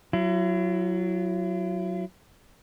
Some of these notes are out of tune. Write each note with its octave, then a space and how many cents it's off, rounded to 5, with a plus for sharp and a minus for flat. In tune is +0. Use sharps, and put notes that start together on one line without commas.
F#3 +0 E4 +40